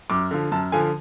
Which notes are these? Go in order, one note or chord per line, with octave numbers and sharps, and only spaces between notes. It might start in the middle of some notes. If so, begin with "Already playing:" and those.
F#2 D6
D3 F3
F#2 A5
D3 F3 G#5